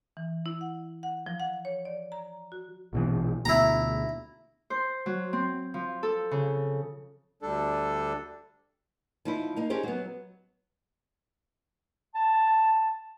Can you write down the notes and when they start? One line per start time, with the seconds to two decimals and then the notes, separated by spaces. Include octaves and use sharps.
0.17 E3
0.46 E4
0.61 F#5
1.03 F#5
1.26 F3
1.40 F#5
1.65 C#5
1.85 D5
2.12 A#5
2.52 F#4
2.93 A#1 B2 E3
3.45 D2 B2 E4 A#5
4.70 C5
5.06 F#3
5.33 C4
5.74 F3
6.03 A4
6.31 C#3
7.42 D2 G3 D4 A4
9.25 F3 D#4 E4
9.56 A#3 D#4
9.70 C#4 D#4 G4 G#4 C5
9.83 F#3 B3
12.16 A5